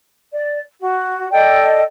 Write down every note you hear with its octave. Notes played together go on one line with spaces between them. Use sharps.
D5
F#4
A4 D5 D#5 G5